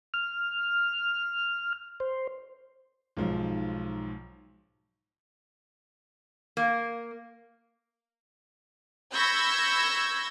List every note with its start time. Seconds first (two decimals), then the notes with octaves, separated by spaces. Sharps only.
0.14 F6
2.00 C5
3.17 B1 G#2 F3
6.57 A#3
9.14 B5 C#6 E6 G6 G#6 A#6